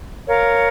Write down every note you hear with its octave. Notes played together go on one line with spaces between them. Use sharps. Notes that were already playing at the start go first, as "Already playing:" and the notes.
A#4 C#5 F5